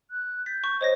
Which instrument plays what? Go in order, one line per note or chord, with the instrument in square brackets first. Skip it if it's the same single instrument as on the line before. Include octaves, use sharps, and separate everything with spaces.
[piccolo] F#6
[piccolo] G6 [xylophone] A6 B6
[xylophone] C#6
[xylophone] C5 C#5 A#6 [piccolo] D#5